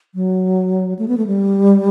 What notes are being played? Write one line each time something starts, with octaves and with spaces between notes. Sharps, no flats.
F#3
A3
B3
A3
G3